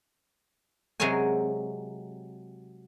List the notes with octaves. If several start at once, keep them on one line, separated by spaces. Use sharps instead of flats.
C3 F#3 G#3 A#4 C#5 G#5